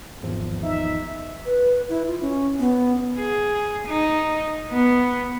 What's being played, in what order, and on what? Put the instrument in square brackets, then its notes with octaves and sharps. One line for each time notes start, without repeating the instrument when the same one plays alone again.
[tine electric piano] G#1 E2 F3
[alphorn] D#4 [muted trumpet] E5
[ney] B4
E4
F4
C#4
B3
[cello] G#4
D#4
B3